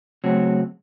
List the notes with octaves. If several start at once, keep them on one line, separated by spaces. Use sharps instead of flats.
C#3 F#3 A3 C4 F#4 C#5